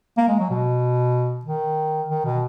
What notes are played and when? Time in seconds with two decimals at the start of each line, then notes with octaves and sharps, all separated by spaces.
0.17 A#3
0.28 G#3
0.39 F#3
0.50 B2
1.45 D#3
2.08 D#3
2.25 B2